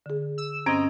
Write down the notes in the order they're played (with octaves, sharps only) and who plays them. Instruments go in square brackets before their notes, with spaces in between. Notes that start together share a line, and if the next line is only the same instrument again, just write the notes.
[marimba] D3 G#4
[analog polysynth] E6
[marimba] G2 [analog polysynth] C4 D#5 [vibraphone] C#4 [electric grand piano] A#5 G#6 D7